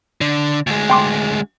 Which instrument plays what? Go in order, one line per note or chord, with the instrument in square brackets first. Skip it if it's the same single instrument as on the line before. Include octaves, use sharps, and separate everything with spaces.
[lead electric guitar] D3
D2 G#3
[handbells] G5 C6 D6